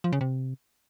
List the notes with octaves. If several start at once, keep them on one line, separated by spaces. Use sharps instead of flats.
F3
C#3
C3